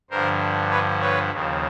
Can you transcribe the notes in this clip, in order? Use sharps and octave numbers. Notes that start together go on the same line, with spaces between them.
G2 D3 F3 A#4 C5
B4 C#5
B4 C#5
D#2 C#3 F3